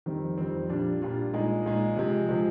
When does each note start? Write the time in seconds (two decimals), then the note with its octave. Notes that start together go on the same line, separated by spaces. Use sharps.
0.06 F2 D#3 G3 C4
0.38 F2 D#3 G3 C4
0.69 A#2 G3 D4 F4
1.02 A#2 G3 D4 F4
1.34 A#2 G#3 D#4
1.66 A#2 G#3 D#4
1.97 C3 F3 G#3
2.29 C3 F3 G#3